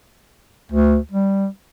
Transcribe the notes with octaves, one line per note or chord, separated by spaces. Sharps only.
D2
G3